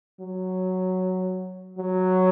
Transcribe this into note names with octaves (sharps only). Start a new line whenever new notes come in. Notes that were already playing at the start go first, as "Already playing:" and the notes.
F#3
F#3